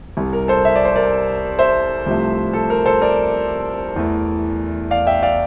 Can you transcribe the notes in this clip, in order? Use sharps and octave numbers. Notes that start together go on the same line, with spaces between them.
C2 C3 G3
A#4
A4 C5
E5
D5
C5
A#4 D5
C5 E5
C2 C3 F3 A3
A4
A#4
A4 C5
A#4 D5
E2 E3 A3
D5 F5
E5 G5
D5 F5